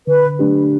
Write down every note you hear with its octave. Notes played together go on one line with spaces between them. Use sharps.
D3 B4
F#3 A3 D4 G4